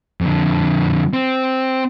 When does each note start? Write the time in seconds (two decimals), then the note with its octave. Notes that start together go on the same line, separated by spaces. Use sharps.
0.21 F2 D3
1.13 C4